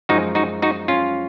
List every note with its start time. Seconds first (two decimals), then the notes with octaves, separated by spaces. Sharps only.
0.09 F#2 F3 G#3 D#4 F#4
0.35 D#4 F#4
0.62 D#4 F#4
0.88 C#4 F4